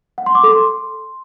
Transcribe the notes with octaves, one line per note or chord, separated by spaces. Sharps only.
F#5
C6
D6
A4
C6